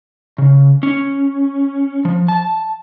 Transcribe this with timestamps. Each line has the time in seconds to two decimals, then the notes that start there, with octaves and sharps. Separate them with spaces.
0.38 C#3
0.83 C#4
2.05 F3
2.28 A5